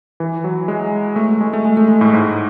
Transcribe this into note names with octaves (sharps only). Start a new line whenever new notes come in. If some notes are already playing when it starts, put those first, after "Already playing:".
E3
F#3
G#3
A3
G#3
A3
G#3
A3
G#3
A2
G#2